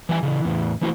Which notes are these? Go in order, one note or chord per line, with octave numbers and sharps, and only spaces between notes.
E3 G3 E4 F#5 G#5
C#3 E3
E2 A2 E3
E3 A3 E4 F#4 C5